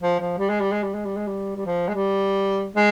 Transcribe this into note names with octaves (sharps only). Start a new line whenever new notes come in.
F3
F3
G3
G#3
G3
G#3
G3
G#3
G3
G#3
G3
G3
F3
G#3
G3
G#3